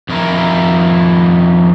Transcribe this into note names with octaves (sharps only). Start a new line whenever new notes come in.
F2 D#3 E4 A#4